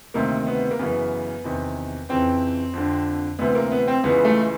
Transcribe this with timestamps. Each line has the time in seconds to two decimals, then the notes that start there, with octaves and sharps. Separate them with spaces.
0.14 D2 C3 D#3 A#3
0.47 B3
0.71 A#3
0.79 F#2 C#3 E3 B3
1.44 E2 C3 D#3
2.09 F2 C#3 E3 C4
2.73 F2 D3
3.39 D2 C3 E3 B3
3.55 A#3
3.72 B3
3.88 C4
4.04 C#2 C#3 E3 B3
4.25 A3